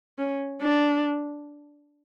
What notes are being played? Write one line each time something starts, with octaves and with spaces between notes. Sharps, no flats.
C#4
D4